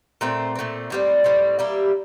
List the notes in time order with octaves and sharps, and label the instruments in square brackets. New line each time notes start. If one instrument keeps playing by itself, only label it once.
[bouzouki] A#2 A3 C4
A#2 A3 C4
A2 G3 C4
A2 G3 C4
G3 A#3 E4 G4